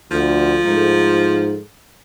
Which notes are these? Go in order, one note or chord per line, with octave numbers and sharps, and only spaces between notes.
D2 F3
G#2 A3 D#4